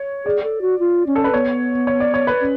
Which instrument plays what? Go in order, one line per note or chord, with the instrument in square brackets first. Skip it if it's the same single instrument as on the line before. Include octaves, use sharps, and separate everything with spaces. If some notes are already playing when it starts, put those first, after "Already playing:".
Already playing: [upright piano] C#5
[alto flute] G#4 [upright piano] D5
[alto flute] A4
F#4
F4
C#4
[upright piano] A4
B4
[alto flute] B3 [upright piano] C#5
[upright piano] C#5
D5
C#5
B4
[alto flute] C#4